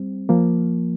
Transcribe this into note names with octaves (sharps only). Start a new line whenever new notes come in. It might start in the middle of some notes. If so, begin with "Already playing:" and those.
Already playing: G3 C4
F3 A#3